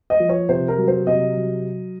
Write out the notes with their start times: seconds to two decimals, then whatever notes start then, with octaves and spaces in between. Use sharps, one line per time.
0.10 D#5
0.20 F3
0.29 C#5
0.49 C3 C5
0.68 A#4
0.78 F#3
0.88 C5
1.07 C3 D#5
1.36 F#3